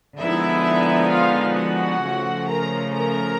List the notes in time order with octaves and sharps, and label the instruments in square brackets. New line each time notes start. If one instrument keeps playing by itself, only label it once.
[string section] D3 F3 G#3 B3 D#4 E4 E5
F4 F5
F#4 F#5
C#3 F3 A3 C#4
A#4 A#5
A#4 A#5